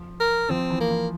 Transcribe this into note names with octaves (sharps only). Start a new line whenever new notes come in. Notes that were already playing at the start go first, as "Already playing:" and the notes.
Already playing: F3
A#4
F3 C4
E3
A#3
F3